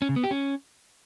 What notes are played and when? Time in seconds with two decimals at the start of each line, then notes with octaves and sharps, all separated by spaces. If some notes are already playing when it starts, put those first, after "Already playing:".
0.02 C#4
0.09 C#3
0.16 B3
0.24 G4
0.31 C#4